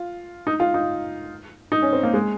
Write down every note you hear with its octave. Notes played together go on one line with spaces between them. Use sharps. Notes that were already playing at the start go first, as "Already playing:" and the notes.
Already playing: F4
D#4
F4
D#4
D#4
C#4
C4
A#3
G#3